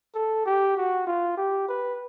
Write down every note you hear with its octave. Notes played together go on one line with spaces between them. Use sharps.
A4
G4
F#4
F4
G4
B4